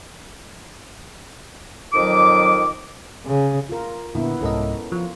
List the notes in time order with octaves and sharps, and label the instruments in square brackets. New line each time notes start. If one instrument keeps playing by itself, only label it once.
[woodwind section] F2 D#3 F#3 D6
[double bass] C#3
[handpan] F4 A#4
[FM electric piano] A#2 D3 [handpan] B3 E4
[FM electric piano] C2 G#2 D#5 [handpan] C#4 A4 A#4
[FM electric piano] F3 [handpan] F4